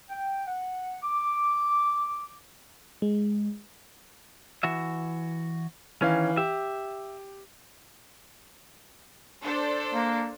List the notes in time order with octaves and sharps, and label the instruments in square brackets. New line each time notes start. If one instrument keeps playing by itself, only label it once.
[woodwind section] G5
F#5
D6
[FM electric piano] G#3
[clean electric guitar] E3 F#4 E5
[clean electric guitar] D#3 C#4 [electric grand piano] E3 F5
[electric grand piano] G4 [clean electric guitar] E5
[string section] D4 A4 C5
[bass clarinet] A#3